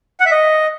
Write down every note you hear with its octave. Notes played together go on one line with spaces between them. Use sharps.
F#5
E5
D#5